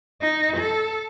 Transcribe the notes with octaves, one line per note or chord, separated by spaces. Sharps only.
D#4
A4